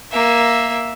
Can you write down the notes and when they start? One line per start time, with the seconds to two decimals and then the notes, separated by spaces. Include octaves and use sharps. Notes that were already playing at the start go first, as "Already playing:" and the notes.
0.11 A#3 E5